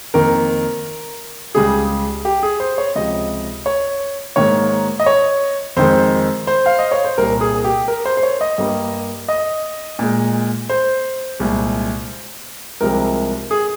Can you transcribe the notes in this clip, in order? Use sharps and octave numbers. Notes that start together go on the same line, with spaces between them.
F2 D#3 A#3 A#4
C#2 C#3 G3 G#4
G4
G#4
C5
C#5
C#2 C3 F3 D#5
C#5
G#2 D#3 A#3 C#5
D#5
C#5
F2 D#3 G#3 C5
C5
F5
D#5
C#5
C5
C2 A#2 G3 A#4
G#4
G4
A#4
C5
C5
C#5
D#5
G2 G3 A#3
D#5
A#2 G#3
C5
C2 A#2 G#3
C2 C3 F3 G#3 A#4
G#4